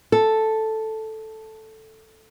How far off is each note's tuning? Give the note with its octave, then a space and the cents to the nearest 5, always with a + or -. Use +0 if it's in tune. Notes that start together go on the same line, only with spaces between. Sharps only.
A4 +0